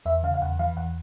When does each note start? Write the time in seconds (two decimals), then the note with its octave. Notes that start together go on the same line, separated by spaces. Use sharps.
0.06 E2 E5
0.23 C#3 F5
0.34 F5
0.42 E2 F#5
0.59 E3 F5
0.77 E2 F#5